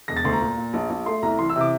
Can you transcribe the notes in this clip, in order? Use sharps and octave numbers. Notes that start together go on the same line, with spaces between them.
E1 A#6
A6
D2 C6
A#5
A#2
A#2
A#1
A#1
A3 C6
C2 A#5
E3 C6
E6
C3
D6